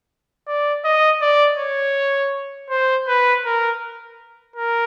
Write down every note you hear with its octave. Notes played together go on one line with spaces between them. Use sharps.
D5
D#5
D5
C#5
C5
B4
A#4
A#4